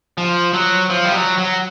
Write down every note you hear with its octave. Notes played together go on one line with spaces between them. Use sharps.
F3
F#3
F3
G3
F#3
F#3